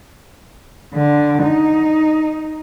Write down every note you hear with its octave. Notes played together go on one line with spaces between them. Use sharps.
D3
D#4